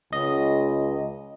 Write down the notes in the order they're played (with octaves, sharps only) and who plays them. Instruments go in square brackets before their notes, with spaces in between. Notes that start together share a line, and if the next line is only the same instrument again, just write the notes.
[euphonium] C#2 [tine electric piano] D#5